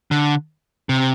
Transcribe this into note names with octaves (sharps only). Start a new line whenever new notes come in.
D3
C3